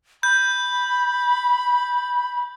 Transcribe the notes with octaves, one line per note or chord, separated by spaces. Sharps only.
B5 G6